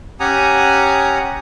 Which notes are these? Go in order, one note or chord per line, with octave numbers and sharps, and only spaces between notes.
C#4 G4 F#5 G#5 A#5 D#6